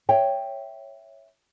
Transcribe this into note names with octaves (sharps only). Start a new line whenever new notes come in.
C#5 E5 G5